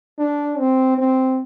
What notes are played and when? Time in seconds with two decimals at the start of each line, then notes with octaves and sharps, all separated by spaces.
0.19 D4
0.59 C4
0.98 C4